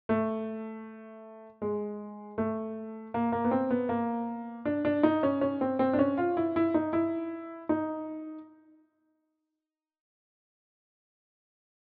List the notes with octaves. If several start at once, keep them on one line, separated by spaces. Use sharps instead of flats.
A3
G#3
A3
A#3
A#3
B3
C4
B3
A#3
D4
D4
D#4
C#4
C#4
C4
C4
D4
C#4
F4
E4
E4
D#4
E4
D#4